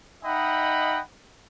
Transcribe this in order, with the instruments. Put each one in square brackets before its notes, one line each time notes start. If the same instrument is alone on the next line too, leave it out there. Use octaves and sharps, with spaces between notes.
[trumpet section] D#4 D#5 E5 F#5 G5 B5